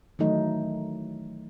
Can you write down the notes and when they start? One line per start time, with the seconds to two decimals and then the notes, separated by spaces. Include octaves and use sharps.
0.19 D#3 E3 F#3 A3 D#4